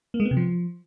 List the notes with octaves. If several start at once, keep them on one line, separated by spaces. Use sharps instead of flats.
A#3
G#3
B3
C3
F3